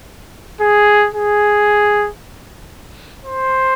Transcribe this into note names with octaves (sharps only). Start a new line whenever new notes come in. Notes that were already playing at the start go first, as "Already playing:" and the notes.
G#4
G#4
C5